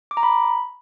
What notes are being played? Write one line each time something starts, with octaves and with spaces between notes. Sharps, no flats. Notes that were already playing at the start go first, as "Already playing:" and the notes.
D6
A#5
B5